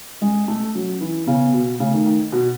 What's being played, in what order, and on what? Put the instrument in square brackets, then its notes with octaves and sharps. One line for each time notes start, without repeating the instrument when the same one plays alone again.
[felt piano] G#3 [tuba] C#4
[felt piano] A3
[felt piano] F#3 [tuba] C#4
[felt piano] E3
[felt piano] C#3 [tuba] B3
[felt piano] B2
[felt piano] C#3 [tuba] A3
[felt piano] D#3
D#3
B2